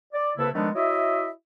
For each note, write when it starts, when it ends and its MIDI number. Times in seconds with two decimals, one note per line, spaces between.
0.13 0.31 74
0.37 0.49 36
0.37 0.49 49
0.37 0.49 58
0.37 0.49 64
0.37 0.49 69
0.37 0.49 71
0.54 0.69 51
0.54 0.69 53
0.54 0.69 56
0.54 0.69 57
0.54 0.69 59
0.54 0.69 62
0.75 1.28 64
0.75 1.28 66
0.75 1.28 73
0.75 1.28 75
0.75 1.28 76